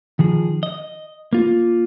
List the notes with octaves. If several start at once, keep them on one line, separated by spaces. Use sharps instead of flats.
D#3 F3 G#4
D#5
A#3 F4